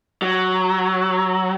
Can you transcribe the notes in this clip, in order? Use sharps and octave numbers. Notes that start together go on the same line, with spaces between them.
F#3